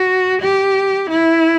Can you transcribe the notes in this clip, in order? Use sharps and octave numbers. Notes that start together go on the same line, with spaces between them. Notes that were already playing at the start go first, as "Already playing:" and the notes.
Already playing: F#4
G4
E4